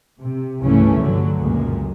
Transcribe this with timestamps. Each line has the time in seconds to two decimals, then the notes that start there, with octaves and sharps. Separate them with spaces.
0.20 C3
0.63 G1 C2 C#3 E3 A3 C#4
1.00 G2 D3 F#3
1.38 C#2 F#2 A#2 G#3